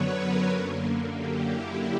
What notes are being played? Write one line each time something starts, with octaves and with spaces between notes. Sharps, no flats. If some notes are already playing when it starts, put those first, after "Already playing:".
Already playing: F#2 D3 F#3 B3 B4 C#5
A#4
F#2 D3 A#3
G4
E4